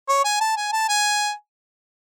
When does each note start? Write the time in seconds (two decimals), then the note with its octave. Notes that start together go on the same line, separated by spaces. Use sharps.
0.08 C#5
0.24 G#5
0.40 A5
0.57 G#5
0.72 A5
0.89 G#5